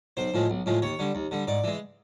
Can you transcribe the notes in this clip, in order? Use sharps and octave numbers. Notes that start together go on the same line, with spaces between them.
B1 C5
A2 F3 G#3
B1
A2 F3 G#3
D#2 C#5
D3 G3
D#2
D3 G3
G#2 D5
E3 G#3